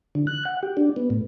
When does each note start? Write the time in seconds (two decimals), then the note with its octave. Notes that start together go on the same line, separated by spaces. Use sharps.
0.15 D3
0.27 F#6
0.45 F#5
0.63 G4
0.77 D4
0.96 B3
1.10 A2